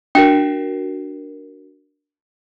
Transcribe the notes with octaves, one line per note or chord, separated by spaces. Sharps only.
D4 F#4 A#4 G5